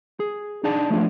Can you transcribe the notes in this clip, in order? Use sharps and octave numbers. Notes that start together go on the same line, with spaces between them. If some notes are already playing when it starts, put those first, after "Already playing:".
G#4
D4 D#4 G#4 D5 A5
F3 A3 A#3 C#4 D4 F4